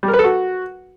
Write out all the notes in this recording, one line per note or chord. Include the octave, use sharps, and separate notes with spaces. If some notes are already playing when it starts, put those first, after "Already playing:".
G3
A#4
B4
A4
F#4